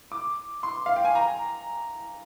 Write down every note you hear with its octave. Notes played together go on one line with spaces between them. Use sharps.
D6
C6
F5
G5
G#5
A#5